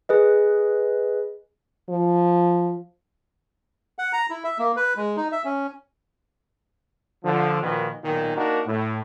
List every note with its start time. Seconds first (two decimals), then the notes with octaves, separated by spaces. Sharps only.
0.09 G#4 B4 D#5
1.89 F3
3.99 F#5
4.13 A#5
4.30 E4
4.44 E5
4.58 A#3
4.77 B4
4.97 G#3
5.16 D#4
5.32 E5
5.45 C#4
7.24 D3 F3
7.62 A#2 D#3 F3 F#4 B4
8.04 B1 A#2 D#3
8.36 A#3 D4 D#4 F#4 A#4
8.67 A2